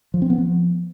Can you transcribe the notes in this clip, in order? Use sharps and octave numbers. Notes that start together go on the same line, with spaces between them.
F3
C4
B3
F3